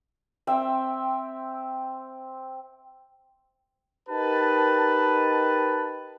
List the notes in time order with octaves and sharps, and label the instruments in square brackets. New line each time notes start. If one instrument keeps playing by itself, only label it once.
[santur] C4 E5 G5
[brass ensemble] D#4 G4 A#4 B4 A5